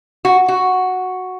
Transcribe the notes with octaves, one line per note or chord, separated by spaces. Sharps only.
F#4
F#4